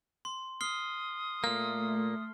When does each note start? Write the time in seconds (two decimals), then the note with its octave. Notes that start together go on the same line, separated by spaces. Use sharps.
0.25 C6
0.61 D#6 F6 C7 G7
1.44 A#2 A3 A#3 F6